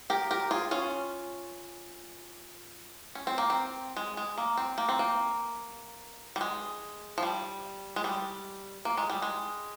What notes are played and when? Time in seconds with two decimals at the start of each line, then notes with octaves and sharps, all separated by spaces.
0.10 G4 A#4
0.31 G4 A#4
0.51 F4 G#4
0.71 C#4 F4
3.15 C#4
3.27 C4
3.38 A#3
3.50 C4
3.97 G#3
4.17 G#3
4.38 A#3
4.57 C4
4.78 A#3
4.89 C4
4.99 A#3
6.36 G3
6.41 G#3
7.18 F3
7.23 G3
7.96 G#3
8.04 G3
8.85 A#3
8.97 G#3
9.10 G3
9.22 G#3